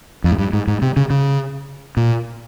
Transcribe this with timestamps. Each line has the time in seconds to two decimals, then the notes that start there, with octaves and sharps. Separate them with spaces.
0.24 F2
0.32 G#2
0.38 G2
0.53 G#2
0.67 G#2
0.82 C3
0.97 C#3
1.10 C#3
1.97 A#2